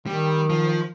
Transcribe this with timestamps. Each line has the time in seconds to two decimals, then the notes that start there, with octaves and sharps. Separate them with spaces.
0.06 D#3 G3
0.50 F3